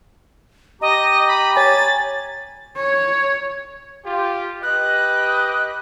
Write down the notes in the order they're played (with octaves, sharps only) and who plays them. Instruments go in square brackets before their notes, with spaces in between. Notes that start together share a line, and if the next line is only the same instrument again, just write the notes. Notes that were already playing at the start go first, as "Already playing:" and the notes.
[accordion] G4 A#5 [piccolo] D#5
[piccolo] B5
[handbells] C#5 G#5 [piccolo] A6
[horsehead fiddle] C#5
[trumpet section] F4 G4
[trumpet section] G4 B4 D#5 [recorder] F#6